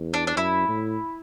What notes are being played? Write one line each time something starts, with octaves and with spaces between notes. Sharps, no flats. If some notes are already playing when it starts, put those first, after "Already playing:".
Already playing: E2
D4
D4
F#2 E4
A2